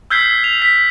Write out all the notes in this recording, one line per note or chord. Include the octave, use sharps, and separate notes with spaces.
E6 F6 G6 G#6 B6 C7
F7
B6